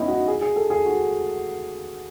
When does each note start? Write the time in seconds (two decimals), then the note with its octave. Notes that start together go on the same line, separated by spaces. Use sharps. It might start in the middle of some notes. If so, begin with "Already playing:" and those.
Already playing: B3 C#4 D#4 E4
0.08 F#4
0.28 G#4
0.41 G#4
0.56 A4
0.70 G#4
0.86 F#4